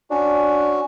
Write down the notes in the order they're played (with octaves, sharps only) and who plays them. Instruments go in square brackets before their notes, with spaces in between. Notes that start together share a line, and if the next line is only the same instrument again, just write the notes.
[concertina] C#4 F#4 [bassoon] D4